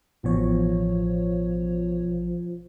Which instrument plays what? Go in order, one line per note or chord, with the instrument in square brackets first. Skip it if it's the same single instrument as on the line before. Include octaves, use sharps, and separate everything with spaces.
[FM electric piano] A1 B2 C#5 [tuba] F3